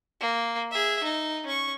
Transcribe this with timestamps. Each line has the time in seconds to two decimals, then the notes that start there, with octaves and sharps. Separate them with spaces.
0.21 A#3
0.71 G#4 E5
1.03 D#4
1.46 C#4 C#6